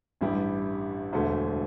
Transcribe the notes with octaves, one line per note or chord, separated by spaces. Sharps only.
A1 G2 G3 E4 G4
E1 D2 D3 A3